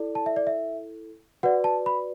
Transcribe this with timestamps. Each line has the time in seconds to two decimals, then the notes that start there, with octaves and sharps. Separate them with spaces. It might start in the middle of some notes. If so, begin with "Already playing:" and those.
Already playing: E4 A4 D5
0.15 A5
0.26 E5
0.36 D5
0.47 E5
1.43 F#4 B4 D5 F#5
1.64 A5
1.86 B5